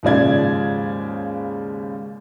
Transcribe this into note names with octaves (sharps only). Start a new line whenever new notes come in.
D#2 G#2 C#3 F3 D5 G#6